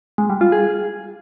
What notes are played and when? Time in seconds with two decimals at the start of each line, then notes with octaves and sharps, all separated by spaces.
0.18 G#3
0.30 G3
0.41 F4
0.52 G#4